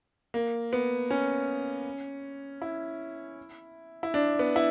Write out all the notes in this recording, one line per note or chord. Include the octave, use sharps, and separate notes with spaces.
A#3
B3
C#4
E4
E4
D4
B3
E4